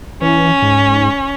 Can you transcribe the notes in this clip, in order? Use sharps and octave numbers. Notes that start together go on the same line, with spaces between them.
E3 C#4
G#2